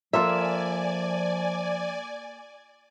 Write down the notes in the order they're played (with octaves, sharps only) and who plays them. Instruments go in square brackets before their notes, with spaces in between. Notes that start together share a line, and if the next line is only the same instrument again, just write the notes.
[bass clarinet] F3 [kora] A#3 F4 A4 [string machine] D5 G#5 [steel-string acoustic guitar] E5